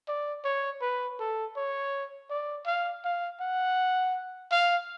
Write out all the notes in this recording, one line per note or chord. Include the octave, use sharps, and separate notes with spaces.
D5
C#5
B4
A4
C#5
D5
F5
F5
F#5
F5